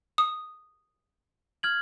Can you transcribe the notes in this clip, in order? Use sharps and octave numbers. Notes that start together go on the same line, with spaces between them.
D#6
F6 G#6 F#7